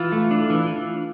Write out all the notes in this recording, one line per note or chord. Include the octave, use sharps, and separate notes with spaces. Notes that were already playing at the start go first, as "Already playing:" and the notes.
Already playing: E3 F4
A3
D4
E3